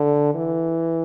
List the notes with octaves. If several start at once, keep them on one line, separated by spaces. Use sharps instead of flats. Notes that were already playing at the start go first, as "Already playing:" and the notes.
Already playing: D3
E3